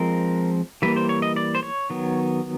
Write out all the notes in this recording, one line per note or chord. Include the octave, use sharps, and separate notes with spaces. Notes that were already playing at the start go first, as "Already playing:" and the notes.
Already playing: F3 G#3 C4 A#4
E3 G3 A#3 B4
C5
C#5
D#5
D5
C5
C#5
D#3 F#3 B3